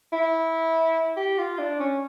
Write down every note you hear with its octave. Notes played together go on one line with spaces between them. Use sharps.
E4
G4
F4
D4
C#4